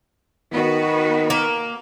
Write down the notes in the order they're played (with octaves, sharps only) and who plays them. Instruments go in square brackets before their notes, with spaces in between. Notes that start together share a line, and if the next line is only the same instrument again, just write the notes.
[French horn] D#3 [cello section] B3 F#4 B4
[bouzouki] A#3